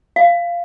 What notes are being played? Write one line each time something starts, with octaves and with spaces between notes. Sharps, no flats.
F5